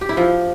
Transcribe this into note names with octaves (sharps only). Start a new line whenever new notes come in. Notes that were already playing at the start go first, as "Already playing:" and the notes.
G4
E4
F3